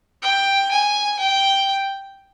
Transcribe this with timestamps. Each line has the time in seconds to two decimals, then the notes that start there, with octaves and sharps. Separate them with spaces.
0.22 G5
0.71 G#5
1.19 G5